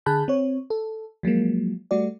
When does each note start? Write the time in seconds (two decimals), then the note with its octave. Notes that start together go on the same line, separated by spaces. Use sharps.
0.06 D3 G#4 A5 B5 F#6 G6
0.28 C4 C#5
0.70 A4
1.23 F3 F#3 G#3 A#3
1.91 G3 A3 F#4 D5